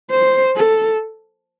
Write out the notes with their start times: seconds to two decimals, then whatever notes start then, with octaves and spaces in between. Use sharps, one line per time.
0.10 C5
0.56 A4